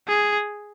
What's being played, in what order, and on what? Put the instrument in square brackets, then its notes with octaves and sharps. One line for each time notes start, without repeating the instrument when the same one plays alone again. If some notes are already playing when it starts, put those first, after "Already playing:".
[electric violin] G#4